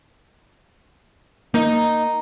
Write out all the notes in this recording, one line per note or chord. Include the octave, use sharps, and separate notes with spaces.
A#3 D#4